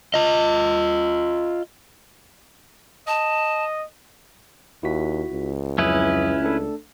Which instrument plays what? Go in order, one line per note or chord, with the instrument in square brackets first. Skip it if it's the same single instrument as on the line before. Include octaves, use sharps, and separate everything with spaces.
[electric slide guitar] F4 D#5
[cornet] D#5 [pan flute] A5
[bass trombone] D#2 [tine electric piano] E4 F#4 B6
[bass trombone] C#2
[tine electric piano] F2 F#3 D#6 [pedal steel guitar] C#4 E4 B4
[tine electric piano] A3 D4 A4